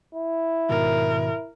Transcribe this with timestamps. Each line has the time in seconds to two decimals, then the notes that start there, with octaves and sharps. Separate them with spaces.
0.15 E4
0.69 G#2 B2 D#3 A#4